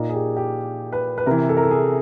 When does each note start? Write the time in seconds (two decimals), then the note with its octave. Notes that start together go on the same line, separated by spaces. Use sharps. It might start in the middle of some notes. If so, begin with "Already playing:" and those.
Already playing: A#2 D#4
0.10 G#4
0.15 G4
0.37 G4
0.92 B4
1.18 B4
1.26 C3 E3 A#4
1.49 A4
1.57 A#4
1.63 A4
1.71 G#4